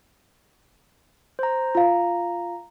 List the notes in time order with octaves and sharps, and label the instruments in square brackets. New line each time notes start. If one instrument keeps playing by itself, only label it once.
[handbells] C5 A#5
[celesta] F4 F5 [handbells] A#5